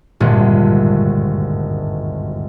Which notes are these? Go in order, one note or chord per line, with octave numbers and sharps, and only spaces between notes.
G#1 D2 G2 A#2